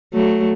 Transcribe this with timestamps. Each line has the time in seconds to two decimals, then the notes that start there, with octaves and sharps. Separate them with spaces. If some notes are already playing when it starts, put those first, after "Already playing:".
0.14 F#3 A3